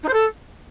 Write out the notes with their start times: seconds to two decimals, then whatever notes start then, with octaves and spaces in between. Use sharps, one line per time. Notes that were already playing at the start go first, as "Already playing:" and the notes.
0.03 D#4
0.08 C5
0.13 A4